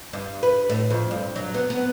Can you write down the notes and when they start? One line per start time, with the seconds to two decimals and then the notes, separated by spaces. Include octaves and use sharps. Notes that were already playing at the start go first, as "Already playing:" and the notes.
0.13 G2
0.43 B4
0.70 A2
0.91 F2
1.11 G2
1.36 F#3
1.54 B3
1.70 B3